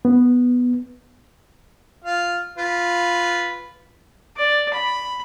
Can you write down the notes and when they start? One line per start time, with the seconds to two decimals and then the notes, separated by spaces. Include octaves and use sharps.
0.05 B3
2.05 F4 F5
2.58 F4 B4
4.37 D5
4.74 B5